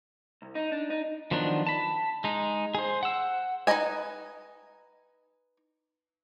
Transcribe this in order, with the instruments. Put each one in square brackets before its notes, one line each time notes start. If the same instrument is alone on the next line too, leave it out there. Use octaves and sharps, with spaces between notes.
[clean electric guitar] C2
D#4
D4
D#4
[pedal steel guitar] D#3 F3 F#3 B3 D4
A5 B5
G#3 D#4
G#4 C5
F#5 E6
[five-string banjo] D#4 A#4 B4 D#5 G#5